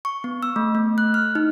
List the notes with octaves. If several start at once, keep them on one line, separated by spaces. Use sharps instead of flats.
C#6
B3
E6
A3
A3
F#6
F6
D#4